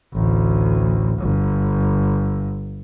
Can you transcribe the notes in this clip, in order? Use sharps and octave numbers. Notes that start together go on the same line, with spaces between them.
A1 D2
G1